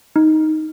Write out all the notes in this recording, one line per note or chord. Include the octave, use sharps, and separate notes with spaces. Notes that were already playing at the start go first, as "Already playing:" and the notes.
D#4